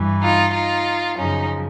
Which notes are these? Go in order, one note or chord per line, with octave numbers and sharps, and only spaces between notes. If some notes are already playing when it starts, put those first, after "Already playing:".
Already playing: G2 E3
D#4 F4
D#4 F4
F#2 C#3 F3 C#4 D#4